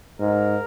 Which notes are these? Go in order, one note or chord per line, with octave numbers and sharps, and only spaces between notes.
G#2 A#4